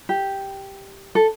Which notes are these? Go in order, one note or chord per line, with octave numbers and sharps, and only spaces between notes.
G4
A4